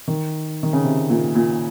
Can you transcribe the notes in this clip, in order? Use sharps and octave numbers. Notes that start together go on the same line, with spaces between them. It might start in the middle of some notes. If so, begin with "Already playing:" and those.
D#3
D#3
C#3
C3
A#2
A#2